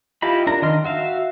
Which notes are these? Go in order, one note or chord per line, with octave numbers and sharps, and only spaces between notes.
E4 F4 G4 D#5 B5
D4 F4 A#4 A#5
D#3 D4 D#5 C6 F6
F#4 E5 F5